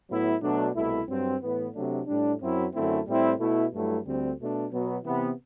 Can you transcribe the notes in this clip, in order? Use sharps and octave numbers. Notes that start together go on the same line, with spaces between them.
A2 F#3 B3 E4
B2 F#3 A3 D4
C2 B2 A3 E4
G2 F#3 C4
A2 E3 B3
C3 F#3 A3 D4
A2 G3 D4
F#2 F#3 C4 E4
F#2 D3 A3 C4 E4
A2 G3 C4 E4
B2 A3 E4
G2 F#3 A3 E4
D2 D3 G3 C4
B2 A3 D4
B2 F#3 B3
C3 E3 B3